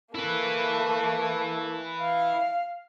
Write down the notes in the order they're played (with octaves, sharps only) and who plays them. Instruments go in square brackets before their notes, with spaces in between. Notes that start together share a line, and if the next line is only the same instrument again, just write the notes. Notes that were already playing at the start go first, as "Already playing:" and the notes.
[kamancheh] A3 A#3 [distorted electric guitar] E4 B4
[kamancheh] F5